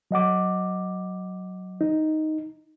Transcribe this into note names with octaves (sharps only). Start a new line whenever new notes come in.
F#3 D#5 F#5 D6
D#4